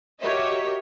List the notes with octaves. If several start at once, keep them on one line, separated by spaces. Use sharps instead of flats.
F#4 G4 A#4 C#5 D#5 E5